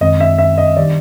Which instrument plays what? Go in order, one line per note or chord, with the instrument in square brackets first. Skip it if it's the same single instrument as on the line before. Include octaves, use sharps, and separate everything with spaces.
[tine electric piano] F#2 D#3 G#3 C4 [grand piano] D#5
[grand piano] E5
E5
D#5
[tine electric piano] D#3 G3 B3 D4 G4 [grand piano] D5